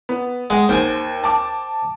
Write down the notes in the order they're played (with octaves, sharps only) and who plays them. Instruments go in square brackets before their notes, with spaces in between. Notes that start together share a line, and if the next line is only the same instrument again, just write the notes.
[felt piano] B3
[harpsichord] G#3 [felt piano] F#5
[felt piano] D#2 [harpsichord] C5 G5 G#5
[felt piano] A5 D6